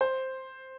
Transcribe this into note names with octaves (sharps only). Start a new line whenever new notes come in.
C5